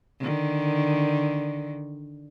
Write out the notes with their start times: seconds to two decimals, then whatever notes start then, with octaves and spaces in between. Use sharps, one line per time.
0.20 D3 D#3